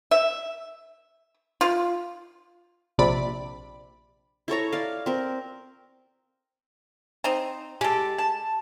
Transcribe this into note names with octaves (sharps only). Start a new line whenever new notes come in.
E5
F4
A#1 C3 D5 B5
E4 A4 C#5 A#5
D5 F5
C4 A#4
C4 D#4
G#3 G4 A4
A5